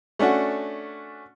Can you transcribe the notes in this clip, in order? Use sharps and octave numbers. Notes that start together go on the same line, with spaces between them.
A3 C#4 D4 F#4